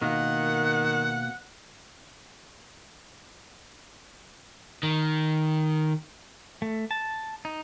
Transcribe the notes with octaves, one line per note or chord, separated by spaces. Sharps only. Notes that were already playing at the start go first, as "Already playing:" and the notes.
B2 D#3 A#3 F#5
D#3
A3
A5
D#4